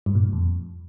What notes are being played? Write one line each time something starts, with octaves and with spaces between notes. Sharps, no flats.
G2
A#2
A2
F2